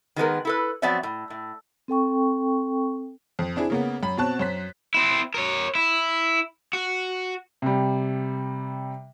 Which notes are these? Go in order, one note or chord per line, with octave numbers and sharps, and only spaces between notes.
D#3 G#3 B3 A#4
E4 A4 B4
F3 F#3 B3 C4 D5 E5
A2
A2
C4 A4 G5 C#6
F2
C4 D4 E4 G#4
C#3 A#3 B3
F#2 B5
B2 C4 C#5 A5 F#6
F#2 C5 B6
C4 E4
A#4 C#5
E4
F#4
C3 G3